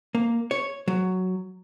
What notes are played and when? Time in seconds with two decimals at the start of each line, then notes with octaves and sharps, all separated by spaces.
0.15 A#3
0.51 C#5
0.88 F#3